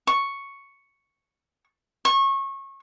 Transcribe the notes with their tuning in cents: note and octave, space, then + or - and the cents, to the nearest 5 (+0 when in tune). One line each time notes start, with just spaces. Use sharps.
C#6 +0
C#6 -25